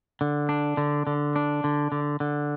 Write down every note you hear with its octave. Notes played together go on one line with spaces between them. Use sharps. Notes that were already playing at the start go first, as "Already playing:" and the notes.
D3
D4
D3
D3
D4
D3
D3
D3